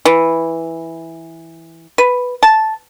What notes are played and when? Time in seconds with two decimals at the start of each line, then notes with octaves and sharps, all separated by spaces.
0.05 E3
1.98 B4
2.43 A5